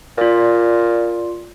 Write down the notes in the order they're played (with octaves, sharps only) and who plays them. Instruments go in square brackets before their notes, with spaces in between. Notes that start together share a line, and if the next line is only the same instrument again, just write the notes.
[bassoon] A#2 [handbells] F4 D5